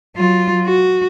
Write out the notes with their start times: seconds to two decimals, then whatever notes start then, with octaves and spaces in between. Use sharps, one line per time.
0.16 F#3 F4
0.65 F#4